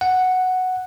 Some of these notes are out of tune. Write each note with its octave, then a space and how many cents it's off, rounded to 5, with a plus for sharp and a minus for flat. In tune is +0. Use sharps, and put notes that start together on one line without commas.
F#5 +0